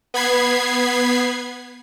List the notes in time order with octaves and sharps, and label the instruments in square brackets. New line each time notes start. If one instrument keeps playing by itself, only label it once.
[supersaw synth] B3 B5 G#6 C7